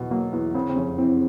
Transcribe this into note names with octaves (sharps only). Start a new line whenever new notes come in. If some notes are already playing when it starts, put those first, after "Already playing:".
Already playing: E2 B2 F#3
F#3 A#3
E2 B3
C#3 C4
C4
F1 C#4
E3 C4